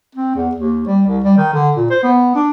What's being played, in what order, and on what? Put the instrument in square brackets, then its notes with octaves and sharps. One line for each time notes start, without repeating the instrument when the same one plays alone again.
[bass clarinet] C4
E2
D#2
G3
C2
G3
D#3
D3
A#2
C5
B3
D4